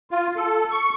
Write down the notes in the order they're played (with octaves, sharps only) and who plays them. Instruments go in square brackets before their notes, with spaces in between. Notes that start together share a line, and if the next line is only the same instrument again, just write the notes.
[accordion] F4
A4
C#6